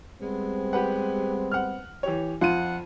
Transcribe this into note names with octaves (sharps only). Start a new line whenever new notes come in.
G3 G#3 B3 C4
G4 B4 F#5
F#5 F6
E3 G4 C#5
F2 F4 F#5 D#7